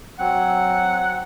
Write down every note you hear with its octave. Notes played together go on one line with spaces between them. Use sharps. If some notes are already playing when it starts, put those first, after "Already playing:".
F#3 C4 F#5